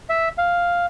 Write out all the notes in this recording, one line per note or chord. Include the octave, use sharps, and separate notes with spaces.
E5
F5